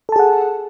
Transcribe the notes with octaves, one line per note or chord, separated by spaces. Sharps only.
G#4 A4 F#5 A5